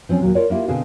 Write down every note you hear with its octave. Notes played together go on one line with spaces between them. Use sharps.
F3 C4 C#4
D#2 A#2 F#3
F4 A#4 C#5 D5
A#3 E4 F4 G4
B2 D3 C4 G#4 F5